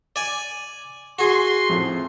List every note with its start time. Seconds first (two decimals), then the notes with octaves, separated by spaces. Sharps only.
0.16 D5 G#5
1.19 F#4 G#4 C6
1.69 F2 A2